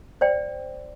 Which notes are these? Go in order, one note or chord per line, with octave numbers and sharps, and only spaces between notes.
C5 D5 G5